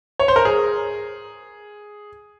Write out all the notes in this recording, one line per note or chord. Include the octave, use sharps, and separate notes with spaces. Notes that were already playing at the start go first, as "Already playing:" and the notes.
C#5
C5
A#4
G#4